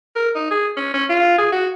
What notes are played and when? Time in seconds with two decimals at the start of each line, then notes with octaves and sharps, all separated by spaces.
0.16 A#4
0.35 D#4
0.51 G#4
0.77 C#4
0.94 C#4
1.09 F4
1.38 G#4
1.52 F#4